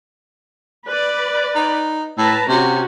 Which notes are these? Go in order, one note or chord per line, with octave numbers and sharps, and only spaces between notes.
B4 D5
D#4
A2 B4 A5 A#5
C3 C#4 F#4